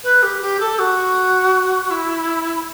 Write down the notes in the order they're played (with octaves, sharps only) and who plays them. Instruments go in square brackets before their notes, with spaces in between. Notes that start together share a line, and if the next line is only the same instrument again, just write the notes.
[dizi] B4
G4
G4
A4
F#4
E4